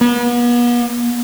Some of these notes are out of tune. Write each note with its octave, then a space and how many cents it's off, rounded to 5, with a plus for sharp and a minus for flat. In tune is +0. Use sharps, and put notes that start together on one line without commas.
B3 -40